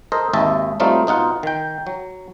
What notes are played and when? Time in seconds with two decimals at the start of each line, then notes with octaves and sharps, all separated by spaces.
0.12 A4 A#4 C5 D#5
0.33 G#1 D#2 D#5 E5 A5
0.80 F#3 G3 A3 C4 D#4 F4
1.07 B2 D#4 F4 F#5
1.43 D#3 G5
1.87 F#3